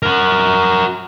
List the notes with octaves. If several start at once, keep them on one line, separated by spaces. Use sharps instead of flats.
F#4 A#4